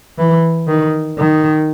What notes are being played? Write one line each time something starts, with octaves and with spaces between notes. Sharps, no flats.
E3
D#3
D#3